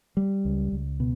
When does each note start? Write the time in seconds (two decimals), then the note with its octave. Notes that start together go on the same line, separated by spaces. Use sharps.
0.17 G3
0.45 C#2
0.72 C#2
1.00 B2